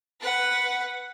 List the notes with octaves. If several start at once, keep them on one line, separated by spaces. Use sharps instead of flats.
B4 F#5